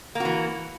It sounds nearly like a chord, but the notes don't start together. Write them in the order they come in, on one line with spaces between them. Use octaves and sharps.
A#3 F#4 E3